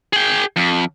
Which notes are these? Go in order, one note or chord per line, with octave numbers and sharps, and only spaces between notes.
G#4 G5
F2